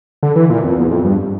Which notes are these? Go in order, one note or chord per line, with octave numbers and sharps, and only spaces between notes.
D3
E3
A#2
F2
E2
F2
G2